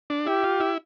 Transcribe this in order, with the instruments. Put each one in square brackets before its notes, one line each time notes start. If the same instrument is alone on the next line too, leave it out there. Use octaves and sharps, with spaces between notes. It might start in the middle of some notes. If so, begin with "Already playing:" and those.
[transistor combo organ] D4
[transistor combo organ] E4 [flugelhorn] G4
[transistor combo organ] F4
E4